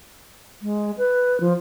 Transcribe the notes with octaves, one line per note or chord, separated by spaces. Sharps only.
G#3
B4
F3